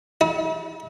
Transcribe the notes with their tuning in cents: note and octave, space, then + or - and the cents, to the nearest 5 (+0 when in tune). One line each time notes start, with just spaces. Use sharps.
E4 -45